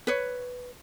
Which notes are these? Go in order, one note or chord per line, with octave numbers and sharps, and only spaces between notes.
B4 C#5